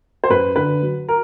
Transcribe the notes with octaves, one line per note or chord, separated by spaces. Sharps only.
C5
F#2 B4
D3 B4
F#3
A#4